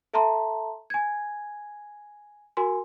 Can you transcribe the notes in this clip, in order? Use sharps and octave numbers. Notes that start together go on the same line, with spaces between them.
A4 E5 A5 A#5 C6
G#5 G#6
F#4 A#4 G#5 C6